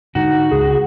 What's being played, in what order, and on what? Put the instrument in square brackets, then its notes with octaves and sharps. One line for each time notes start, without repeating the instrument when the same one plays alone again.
[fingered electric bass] G#2 D3 [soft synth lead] D#4 [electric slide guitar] F#4
[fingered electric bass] C#2 [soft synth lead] G#4